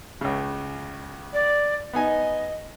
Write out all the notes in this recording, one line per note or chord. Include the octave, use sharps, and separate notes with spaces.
C#2 C#3
D5
B3 D#4 D#5 G#5